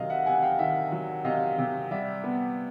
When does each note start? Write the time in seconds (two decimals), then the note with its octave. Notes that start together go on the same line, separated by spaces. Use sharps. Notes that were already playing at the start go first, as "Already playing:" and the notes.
Already playing: C3 D#3 F#3 D#5 F5
0.10 E5 F#5
0.26 C3 F#5 G#5
0.42 F5 G5
0.59 D#3 E5 F#5
0.92 F#3
1.25 C3 D#5 F5
1.58 C3
1.91 G3 D5 E5
2.24 B3